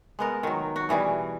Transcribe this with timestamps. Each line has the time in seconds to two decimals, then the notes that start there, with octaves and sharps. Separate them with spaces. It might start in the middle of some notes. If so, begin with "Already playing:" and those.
0.19 G#3 B3 A#4
0.43 D#3 F#3
0.76 F#4
0.89 B2 E3 G3 G#4